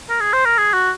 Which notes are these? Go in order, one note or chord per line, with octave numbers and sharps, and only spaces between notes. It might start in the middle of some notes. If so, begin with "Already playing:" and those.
A#4
G#4
C5
A#4
G#4
F#4